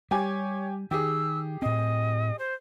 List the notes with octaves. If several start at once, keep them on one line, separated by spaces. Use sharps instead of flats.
G3 G4 C#5 G#5
D#3 G4 G#4 E6
A2 C4 D#5
C5